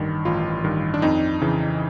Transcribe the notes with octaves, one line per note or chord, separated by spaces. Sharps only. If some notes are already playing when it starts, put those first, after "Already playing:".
Already playing: A1 G2 D#3
A1 F4
G2 D#3
D4
F2 D#4
C#3 E3